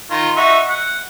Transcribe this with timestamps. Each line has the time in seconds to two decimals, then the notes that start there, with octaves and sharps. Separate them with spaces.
0.11 D#3 F4
0.36 D#4 F#4 E5
0.69 F#5